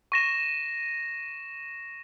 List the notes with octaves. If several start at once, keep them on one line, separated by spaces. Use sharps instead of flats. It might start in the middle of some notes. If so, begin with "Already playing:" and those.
C#6 A#6 E7